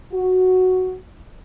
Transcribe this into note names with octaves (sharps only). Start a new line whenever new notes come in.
F#4